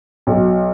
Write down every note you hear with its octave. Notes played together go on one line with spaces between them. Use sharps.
B1